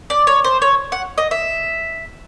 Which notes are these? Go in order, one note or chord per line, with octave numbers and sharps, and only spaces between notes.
D5
C#5
C5
C#5
F#5
D#5
E5